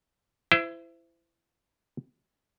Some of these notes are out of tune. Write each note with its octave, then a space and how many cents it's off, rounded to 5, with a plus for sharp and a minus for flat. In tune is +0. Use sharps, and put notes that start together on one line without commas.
E4 +20 C5 -30